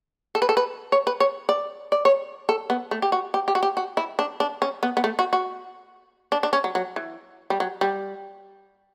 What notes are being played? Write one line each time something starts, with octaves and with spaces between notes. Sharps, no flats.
A4
B4
A4
B4
C#5
B4
C#5
D5
D5
C#5
A4
B3
A3
G4
F#4
G4
G4
F#4
G4
F#4
E4
D4
D4
C#4
B3
B3
A3
F#4
F#4
D4
D4
C#4
F#3
F#3
E3
G3
F#3
G3